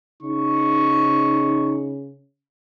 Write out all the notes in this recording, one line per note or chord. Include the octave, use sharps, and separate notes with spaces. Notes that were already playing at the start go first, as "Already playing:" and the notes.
C#3 D#4 C#6